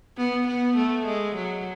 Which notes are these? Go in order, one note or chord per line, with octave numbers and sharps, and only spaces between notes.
B3
B3
A3
G#3
F#3